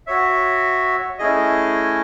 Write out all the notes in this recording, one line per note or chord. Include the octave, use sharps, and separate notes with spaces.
F#4 C#5 E5
A3 C#4 E4 G#4 D#5